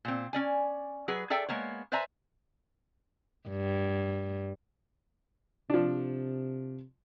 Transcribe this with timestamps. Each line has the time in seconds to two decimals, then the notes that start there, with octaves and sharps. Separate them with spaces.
0.05 A#2 C4
0.33 C#4 D5 G#5
1.08 F#3 G#4 B4
1.30 G#4 A4 D5 E5 G5
1.49 G#3 A#3 B3 C#5
1.92 B4 C5 D5 E5 G#5 A#5
3.49 G2
5.70 C3 F3 D4